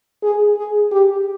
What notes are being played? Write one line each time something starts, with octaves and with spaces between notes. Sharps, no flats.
G#4
G#4
G4